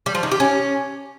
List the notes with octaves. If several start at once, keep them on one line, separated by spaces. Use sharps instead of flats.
G3
F3
D#3
G4
C#4